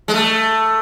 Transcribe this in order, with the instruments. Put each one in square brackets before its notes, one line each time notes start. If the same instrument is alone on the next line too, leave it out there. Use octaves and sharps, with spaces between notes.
[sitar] G#3
A3